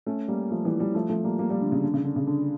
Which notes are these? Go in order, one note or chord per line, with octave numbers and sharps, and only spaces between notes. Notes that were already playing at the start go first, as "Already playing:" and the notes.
A3 C#4
G3 A#3
F3 A3
E3 G3
E3 G3
F3 A3
F3 A3
G3 A#3
G3 A#3
G3 A#3
D3
C#3
D3
C#3
D3
C#3
D3